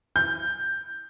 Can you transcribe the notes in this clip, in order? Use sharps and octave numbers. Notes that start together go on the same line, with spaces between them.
G6